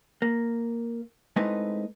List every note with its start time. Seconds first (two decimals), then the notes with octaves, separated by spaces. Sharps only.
0.22 A#3
1.36 G#3 A3 C4 D#4 E4 B4